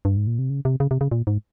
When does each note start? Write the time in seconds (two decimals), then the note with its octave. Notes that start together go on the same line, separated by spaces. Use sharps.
0.05 G2
0.17 G#2
0.27 A#2
0.39 C3
0.50 C#3
0.65 C3
0.80 C#3
0.91 C3
1.01 C#3
1.12 A#2
1.27 G#2